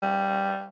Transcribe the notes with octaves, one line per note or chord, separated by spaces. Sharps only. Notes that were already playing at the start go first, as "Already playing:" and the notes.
G3